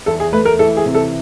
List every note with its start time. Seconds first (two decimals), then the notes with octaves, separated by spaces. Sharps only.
0.06 E2 A4
0.20 G#4
0.32 A3 B4
0.45 A#4
0.59 E3 A4
0.77 G#4
0.85 C3
0.94 A4